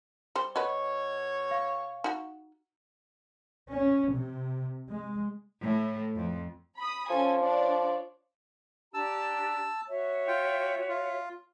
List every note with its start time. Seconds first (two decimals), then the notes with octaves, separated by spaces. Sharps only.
0.36 G3 C5
0.56 B2 F#4 B4 C#5 D#5
1.51 F5 C#6
2.04 D#4 F#4
3.72 C#4
4.12 C3
4.89 G#3
5.64 A2
6.16 F2
6.79 B5 D#6
7.10 F3 C#4 A4 G#5
7.40 D4 C#5 D5
8.94 D4 G4 A5 A#5 E6
9.89 F#4 C#5 E5
10.28 F4 G5
10.89 F4